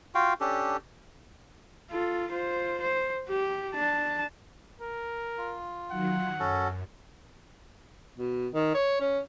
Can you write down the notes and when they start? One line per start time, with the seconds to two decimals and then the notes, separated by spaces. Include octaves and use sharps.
0.15 F4 F#4 F5 G5
0.40 C#4 D4 G4 A4
1.91 F4 A4
2.32 F4 C5
2.81 C5
3.29 G4
3.75 D4 A5
4.81 A#4
5.38 F4
5.90 D#3 F#3 F#5
6.40 F#2 C#4 F#4 A4
8.17 B2
8.54 D#3
8.74 C#5
9.00 C#4